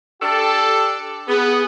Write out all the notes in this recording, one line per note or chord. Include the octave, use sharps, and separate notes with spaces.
D4 G4 A4
B3 G#4